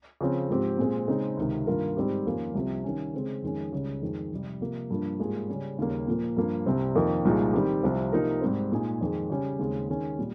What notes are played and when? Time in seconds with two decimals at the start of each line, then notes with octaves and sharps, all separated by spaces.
0.21 C#3 F3 C4
0.50 G#2 F3 C4 G4
0.78 A#2 G#3 C4
1.08 C#3 G#3 C4 D#4
1.37 C#2 C3 D#3
1.67 G2 D#3 A#3 F4 A#4
1.97 G#2 G3 C4 D#4 G4
2.25 F2 D#3 A#3 C#4 F4
2.54 C2 C3 F3 C4
2.84 D#3 G3 C#4
3.14 C#3 G#3 C4
3.42 F2 D#3 G#3 C#4
3.72 C#2 C#3 G3
4.02 F2 D#3 G#3
4.32 F2 C3 G3
4.61 C3 F3 A#3
4.90 G2 F3 A#3
5.20 G#2 G3 A#3 F4 G#4
5.48 C#3 G3 C#4
5.78 D#2 C#3 G3 A#3
6.07 A#2 F3 A#3
6.37 G2 F3 A#3
6.66 C2 C3 G3 C4
6.95 F2 D#3 A#3 F4 A#4
7.25 C2 A#2 F3 G#3 D#4
7.53 D#3 G3 C4 G4
7.83 C2 C3 F3 C4 F4
8.13 C3 F3 A#3 D#4 A#4
8.41 G#2 G3 C4
8.72 A#2 G#3 D#4 G#4
9.01 F2 D#3 G#3
9.30 C#3 G3 C#4 G4
9.59 D#2 C#3 G#3 C4
9.89 D#3 G#3 C#4
10.19 A#2 G3